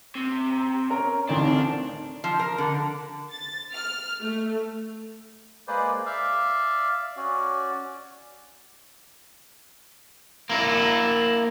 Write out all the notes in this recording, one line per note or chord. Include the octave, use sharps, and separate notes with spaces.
C3
A#5
C#4 A#4 A#5
A1 D2 C4 D4 D#4 F5
F3
A#4
D3
A6
F6
A3
G#3 A#3 G#4 B4 C5 D5
D5 E5 F5
C#4 F#4 D5
A#3 E4